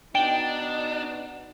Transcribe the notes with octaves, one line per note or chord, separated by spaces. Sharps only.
B2 D4 D#4 G5